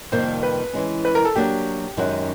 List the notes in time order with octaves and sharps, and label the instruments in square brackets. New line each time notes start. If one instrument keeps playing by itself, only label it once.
[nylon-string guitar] F2 C3 D#3 G3 A#3 [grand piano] C5
[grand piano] B4
[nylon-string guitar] E3 G#3 C#4
[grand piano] B4
A#4
A4
[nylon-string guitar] F#3 A#3 D4 F#4 [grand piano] G4
[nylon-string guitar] F#2 D#3 G#3 C#4 F#4